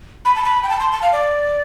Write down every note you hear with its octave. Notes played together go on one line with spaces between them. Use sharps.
B5
A5
B5
G5
A5
C6
A5
F5
D5